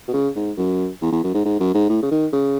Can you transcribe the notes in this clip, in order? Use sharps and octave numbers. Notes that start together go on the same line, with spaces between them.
B2
C#3
G#2
F#2
E2
E2
F#2
G#2
G#2
F#2
G#2
A2
C#3
D#3
C#3